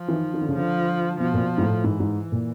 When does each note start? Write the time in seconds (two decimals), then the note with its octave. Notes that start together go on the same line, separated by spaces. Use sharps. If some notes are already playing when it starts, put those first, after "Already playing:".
Already playing: F3
0.08 E3
0.13 D#3
0.34 D#3
0.41 D3
0.48 C#3
0.55 D3 F3
1.20 B2 F3
1.34 A#2
1.41 B2
1.58 G#2
1.62 A2
1.84 G#2 E3
2.00 G#2
2.32 A#2